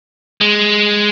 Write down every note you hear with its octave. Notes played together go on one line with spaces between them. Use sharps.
G#3